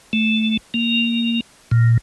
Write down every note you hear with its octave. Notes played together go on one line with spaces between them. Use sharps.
A3
A#3
A#2